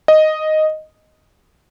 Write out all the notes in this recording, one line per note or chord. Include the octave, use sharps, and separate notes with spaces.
D#5